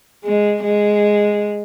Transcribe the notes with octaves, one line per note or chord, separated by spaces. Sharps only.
G#3
G#3